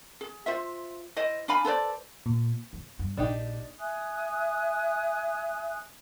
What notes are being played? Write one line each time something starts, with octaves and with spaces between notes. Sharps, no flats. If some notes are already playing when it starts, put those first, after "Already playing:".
G#4
F4 C5 E5
E4 C5 D#5
D4 F5 G#5 B5
A4 B4 C5 D5
A#2
A3
G2
A#1 D4 D#4 G4
E5 G#5 D#6 F#6